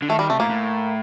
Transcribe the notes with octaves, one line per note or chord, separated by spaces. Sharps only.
D3
D#3 A3
D#3 G3
C3 A3
A2 A#3
A2